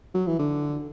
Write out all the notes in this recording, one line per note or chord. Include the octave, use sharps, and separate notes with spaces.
F#3
E3
D3